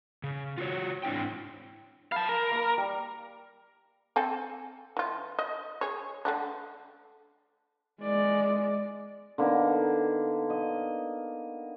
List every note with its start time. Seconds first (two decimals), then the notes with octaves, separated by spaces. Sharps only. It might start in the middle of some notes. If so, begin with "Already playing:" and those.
0.23 C#3
0.58 F4 F#4 C5 C#5
1.03 G#2 C4 D4 E4 G5
2.12 F5 A5 B5
2.29 A#4
2.51 A#3 A#5
2.78 G3
4.16 C4 A4 G#5
4.97 E3 F4
5.39 D#5
5.81 G#4 C#5
6.25 D3 A3 D4
8.02 G#3 D5
9.38 D3 A#3 B3 D#4
10.50 D#5